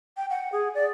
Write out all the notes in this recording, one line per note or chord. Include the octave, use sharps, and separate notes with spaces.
G5
F#5
G#4
D5